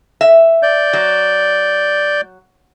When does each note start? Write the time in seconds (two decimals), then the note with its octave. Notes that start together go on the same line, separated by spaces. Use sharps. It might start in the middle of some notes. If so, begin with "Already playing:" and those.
0.21 E5
0.63 D5 G6
0.93 F#3